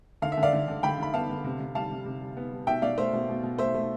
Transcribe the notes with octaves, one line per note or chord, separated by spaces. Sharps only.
D3 F5
E5
D3
D5 F5
D3
D3
D3 G5 B5
D3 B5
B3 F5 A5
D3
C3
C3
G3 F5 A5
C3
C3
G3
B3
G3
B2 E5 G5
B2 D5 F5
A3 C5 E5
B2
B2
B2
A3 C5 E5
A3